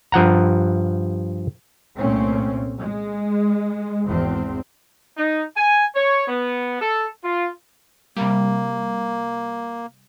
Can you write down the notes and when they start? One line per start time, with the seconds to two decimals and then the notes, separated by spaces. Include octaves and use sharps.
0.12 G2 F3 F#5 A#5
1.99 C2 A#2 A3 C4 C#4
2.80 G#3
4.05 G#1 E2 C4
5.17 D#4
5.56 G#5
5.95 C#5
6.28 B3
6.81 A4
7.24 F4
8.17 C3 G3 A#3